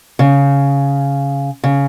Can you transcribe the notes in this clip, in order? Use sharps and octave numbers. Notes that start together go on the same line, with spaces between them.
C#3
C#3